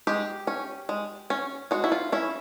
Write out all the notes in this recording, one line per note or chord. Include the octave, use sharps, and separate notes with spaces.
G#3 G4
C#4
G#3
C#4
G#3 F#4
E4
F4
C#4 E4